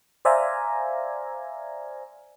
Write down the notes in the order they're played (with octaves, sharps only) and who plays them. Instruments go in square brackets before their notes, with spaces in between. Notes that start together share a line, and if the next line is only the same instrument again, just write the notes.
[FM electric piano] C5 D5 E5 F5 G#5 A#5